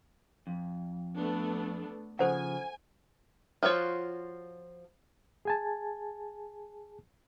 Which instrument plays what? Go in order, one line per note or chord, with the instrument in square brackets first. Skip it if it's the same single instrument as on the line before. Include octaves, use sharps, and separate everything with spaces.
[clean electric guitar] F2
[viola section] A3 B3 D4
[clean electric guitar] C#3 F3 [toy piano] A4 C5 F#5 [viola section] G#5
[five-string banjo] F3 F4 F#4 C#5
[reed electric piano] G#4 G#5 A5